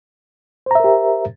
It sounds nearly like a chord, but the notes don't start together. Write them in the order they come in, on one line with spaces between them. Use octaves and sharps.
C5 A#5 E5 A#4 G4